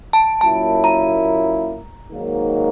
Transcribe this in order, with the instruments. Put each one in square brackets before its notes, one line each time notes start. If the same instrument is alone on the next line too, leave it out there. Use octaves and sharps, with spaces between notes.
[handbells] A5
[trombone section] A#2 F#3 A#3 C#4 E4 [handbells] A5
[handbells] A#5
[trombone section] G#2 D#3 F#3 A#3